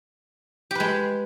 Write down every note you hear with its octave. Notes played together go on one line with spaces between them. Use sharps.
G#3 G4 B4